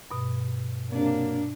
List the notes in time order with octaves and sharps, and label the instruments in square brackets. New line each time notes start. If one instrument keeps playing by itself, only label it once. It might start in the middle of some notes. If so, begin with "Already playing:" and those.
[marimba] G2 B2
[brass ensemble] C3 F#3 A#3 [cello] D4